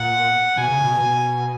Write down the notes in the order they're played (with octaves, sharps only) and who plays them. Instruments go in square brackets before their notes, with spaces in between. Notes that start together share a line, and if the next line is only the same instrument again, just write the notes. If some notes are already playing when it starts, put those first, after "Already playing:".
Already playing: [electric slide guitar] A#2 [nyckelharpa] F#5
[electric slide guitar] B2 [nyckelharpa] G#5
[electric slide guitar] C#3
B2
B2